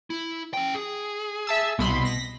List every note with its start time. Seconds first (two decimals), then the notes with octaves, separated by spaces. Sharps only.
0.10 E4
0.54 C#4 G5
0.75 G#4
1.47 E5 A5 E6
1.79 C2 B2 B5 C6
2.05 A#6 B6